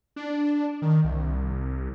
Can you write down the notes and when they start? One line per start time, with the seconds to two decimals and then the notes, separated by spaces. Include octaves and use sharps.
0.16 D4
0.82 D#3
1.04 C2